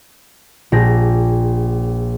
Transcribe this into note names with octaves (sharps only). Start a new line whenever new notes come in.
A#1 G4 G#4 A#6